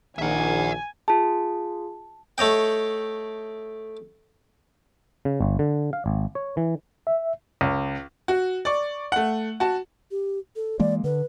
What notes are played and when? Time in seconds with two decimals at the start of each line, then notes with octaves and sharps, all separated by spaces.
0.19 A#1 D#3 E5 F#5 G#5
1.08 F4 G#4 A5
2.38 A3 C#5 D#5 G5
5.25 C#3
5.41 G1
5.59 D3
5.93 F5
6.06 G#1
6.35 C#5
6.57 E3
7.07 E5
7.61 C#2
8.28 F#4
8.65 D5 C#6
9.12 A3 F#5
9.60 F#4 A5
10.11 G4
10.56 A4
10.79 E3 G#3 A#3 D5
11.04 D3 B4